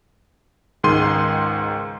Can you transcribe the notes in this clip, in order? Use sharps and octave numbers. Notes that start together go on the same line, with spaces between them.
C#2 G#2 D#3 G#4 C6 D#7